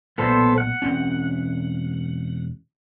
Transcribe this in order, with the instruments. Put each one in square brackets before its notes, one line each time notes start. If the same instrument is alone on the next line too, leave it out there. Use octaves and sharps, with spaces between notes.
[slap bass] B1 A#2 A3 [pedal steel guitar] B3 A4 C5
[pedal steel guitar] F#5
[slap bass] E1 C4 C#4